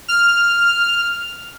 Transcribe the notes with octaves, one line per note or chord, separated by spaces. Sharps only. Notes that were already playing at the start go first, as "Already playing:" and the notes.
F6